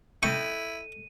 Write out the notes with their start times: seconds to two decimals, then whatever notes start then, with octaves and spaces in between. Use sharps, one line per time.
0.23 E4 A4 D#5 G5 C#6 D#7